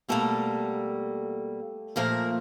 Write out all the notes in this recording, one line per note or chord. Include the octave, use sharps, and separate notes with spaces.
B2 G3 A3 A#3 A4
A#2 F3 A3 A#3 A#4